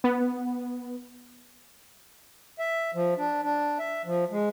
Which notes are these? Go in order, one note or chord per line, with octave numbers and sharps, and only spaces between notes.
B3
E5
F3
D4
D4
E5
F3
G#3